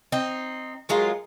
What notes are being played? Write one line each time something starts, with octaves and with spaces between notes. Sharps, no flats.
C4 D#4
F#3 G#3 F4 A#4